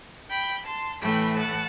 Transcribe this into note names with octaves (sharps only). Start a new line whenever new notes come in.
G5 B5
A5 C6
A2 E3 A3 G5 B5
F#5 A5